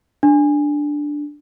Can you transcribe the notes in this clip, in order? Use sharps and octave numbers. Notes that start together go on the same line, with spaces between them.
D4